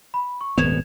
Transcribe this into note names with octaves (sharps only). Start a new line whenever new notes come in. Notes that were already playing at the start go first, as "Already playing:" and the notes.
B5
C#6
D#1 G#1 B3 G#6 E7 F7